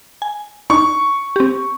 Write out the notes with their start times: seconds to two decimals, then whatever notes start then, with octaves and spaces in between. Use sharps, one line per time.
0.22 G#5
0.70 D4 D#4 C#6
1.36 C4 G4